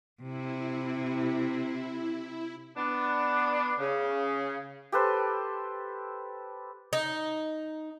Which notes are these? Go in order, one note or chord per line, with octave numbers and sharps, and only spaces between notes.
C3 E4
B3 D4
C#3
G4 A4 B4 C5
D#4